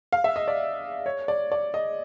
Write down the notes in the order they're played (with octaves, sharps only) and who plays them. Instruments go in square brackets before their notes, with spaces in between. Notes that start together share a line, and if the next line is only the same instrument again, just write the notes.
[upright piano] F5
E5
D#5
D5
C#5
D5
D5
D#5